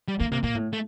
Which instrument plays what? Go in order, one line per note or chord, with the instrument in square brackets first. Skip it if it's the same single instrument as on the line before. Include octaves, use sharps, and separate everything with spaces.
[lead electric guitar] G3
[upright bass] D3 [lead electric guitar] A#3
[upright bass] C3 [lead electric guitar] A#3
[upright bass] A#2 [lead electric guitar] A#3
[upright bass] A2
[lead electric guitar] A3